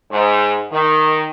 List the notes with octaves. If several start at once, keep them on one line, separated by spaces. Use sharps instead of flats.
G#2
D#3